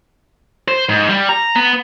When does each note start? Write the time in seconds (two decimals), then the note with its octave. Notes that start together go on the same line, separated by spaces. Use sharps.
0.68 C5
0.89 G#2
1.09 G3
1.29 A#5
1.56 B3